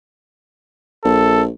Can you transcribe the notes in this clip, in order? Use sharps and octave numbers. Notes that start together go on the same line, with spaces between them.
A#1 A4